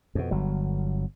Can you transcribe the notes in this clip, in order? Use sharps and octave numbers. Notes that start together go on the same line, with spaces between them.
F2 B2
G1 F#3